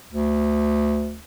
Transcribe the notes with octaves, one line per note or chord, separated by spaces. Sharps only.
D2